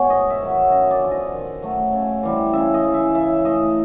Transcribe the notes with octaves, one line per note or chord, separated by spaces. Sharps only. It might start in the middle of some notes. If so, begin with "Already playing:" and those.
Already playing: B2 G#3 B3 C#5
G#2 D#5
E5
D#3 F#3
E5
F#2 D#5
D5
D3 F3 G#3
D#5
D#3
F#3 A3
C#3
E3 G3 C4
C#3 E5
D#5
E3 G#3
E5
C#3 E5
E3 A3 D#5